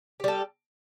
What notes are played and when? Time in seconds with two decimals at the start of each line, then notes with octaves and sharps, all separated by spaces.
0.20 G4
0.24 G3
0.28 A4